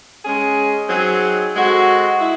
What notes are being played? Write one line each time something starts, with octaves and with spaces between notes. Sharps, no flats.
G#3 C#4 G#4
F#3 C4 D#4 G#4
G#3 C4 F#4 A4
E4